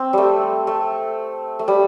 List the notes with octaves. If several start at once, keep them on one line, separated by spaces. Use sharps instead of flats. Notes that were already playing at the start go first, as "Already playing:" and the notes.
Already playing: C4
G3 A3
A3
A3
G3